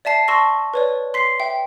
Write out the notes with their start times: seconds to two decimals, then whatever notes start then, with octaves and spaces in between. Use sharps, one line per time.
0.05 D5 E5 A5 C7
0.28 A5 C6 C#6 E6 A#6
0.74 B4 C#5 D5
1.14 C6 B6 C7
1.39 E5 G5